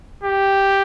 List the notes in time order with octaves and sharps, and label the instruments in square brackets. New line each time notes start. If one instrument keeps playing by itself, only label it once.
[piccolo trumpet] G4